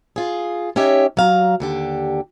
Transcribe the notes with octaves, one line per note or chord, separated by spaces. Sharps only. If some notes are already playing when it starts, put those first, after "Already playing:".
F4 G#4
C#4 D#4 G4 C#5 E5
F#3 F5 A#5
D#2 D3 G4